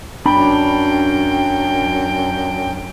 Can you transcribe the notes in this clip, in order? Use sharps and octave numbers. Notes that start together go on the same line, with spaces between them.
F#2 D4 G5 B5